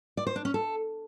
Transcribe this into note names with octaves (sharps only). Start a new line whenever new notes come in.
D5
C5
D4
C#4
A4